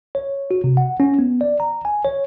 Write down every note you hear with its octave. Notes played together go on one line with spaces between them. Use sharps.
C#5
F#4
C3
F#5
C#4
B3
D5
A#5
G#5
C#5